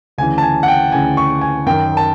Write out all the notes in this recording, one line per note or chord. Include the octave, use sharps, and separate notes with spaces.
D2 C#3 E3 G#5
A5
G#5
F#5
G5
D2 C#3 E3 G#5
C#6
G#5
F#2 D#3 G5
A5